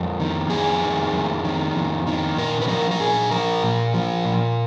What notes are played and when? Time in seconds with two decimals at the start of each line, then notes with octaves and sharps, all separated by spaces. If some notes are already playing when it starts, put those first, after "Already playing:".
Already playing: F2 A#4
0.20 D#3
0.50 F2 G#4
0.82 D#3
1.13 F2
1.44 D#3
1.76 F2
2.07 D#3
2.37 A#2 A#4
2.62 B4
2.68 F3 A#4
2.91 A#4
3.00 A#2 G#4
3.31 F3 A#4
3.63 A#2
3.94 F3
4.25 A#2